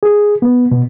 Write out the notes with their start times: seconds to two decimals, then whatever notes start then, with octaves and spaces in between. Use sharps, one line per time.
0.03 G#4
0.42 B3
0.71 B2